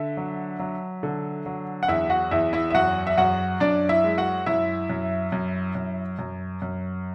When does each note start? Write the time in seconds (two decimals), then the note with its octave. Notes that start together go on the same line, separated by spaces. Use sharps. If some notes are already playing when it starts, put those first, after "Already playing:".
Already playing: D3 E5
0.17 F#3
0.59 F#3
1.03 D3
1.46 F#3
1.83 F#5
1.88 E2 E4 E5
2.10 F#4 F#5
2.31 E2 E4 E5
2.53 E4 E5
2.71 E5
2.74 F#2 F#4 F#5
3.07 E5
3.17 F#2 F#4 F#5
3.60 F#2 D4 D5
3.89 E4 E5
4.04 G#3
4.18 F#4 F#5
4.46 F#2 E4 E5
4.90 F#2
5.32 F#2
5.75 F#2
6.19 F#2
6.62 F#2